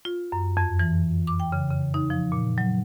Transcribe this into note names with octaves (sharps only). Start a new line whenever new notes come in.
F4
F#2
F2
E3
D6
G5
C#3
C#3
D#4
F3
A#2
F#3